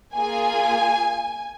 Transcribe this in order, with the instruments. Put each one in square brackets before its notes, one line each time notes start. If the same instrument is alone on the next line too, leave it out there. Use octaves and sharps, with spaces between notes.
[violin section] A#3 F4 G#4 G#5